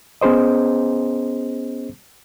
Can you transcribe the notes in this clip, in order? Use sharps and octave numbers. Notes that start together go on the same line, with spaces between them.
B3 C#4 G#4 C5 D#5